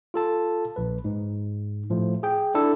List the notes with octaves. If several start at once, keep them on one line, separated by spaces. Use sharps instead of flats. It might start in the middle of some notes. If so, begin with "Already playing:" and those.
F4 A4 A5
A#1 B4
G#2
A2 F3 A3
G#4 G5
D4 E4 A4